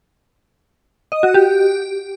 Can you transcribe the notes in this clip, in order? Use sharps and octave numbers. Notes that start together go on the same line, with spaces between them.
D#5
F#4
G4